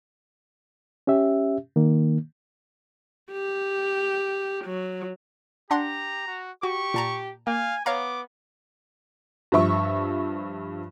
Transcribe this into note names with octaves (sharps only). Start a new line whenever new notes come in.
C#4 G4 E5
D#3 A#3
G4
F#3
D4 G4 F#5 A#5 C6
F#4
F#4 G4 C#6
A#2 A5 A#5
A#3 F5 G#5
B3 C#5 F5 A#5 D6
G2 F3 E5 C#6